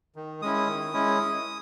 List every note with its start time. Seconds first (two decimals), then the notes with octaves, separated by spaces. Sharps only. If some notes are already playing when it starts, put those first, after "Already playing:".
0.16 D#3
0.42 G#3 C#4 E4 D#6
0.68 D#3
0.93 G#3 C#4 E4